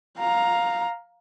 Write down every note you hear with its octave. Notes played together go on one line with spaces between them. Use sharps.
F5 A#5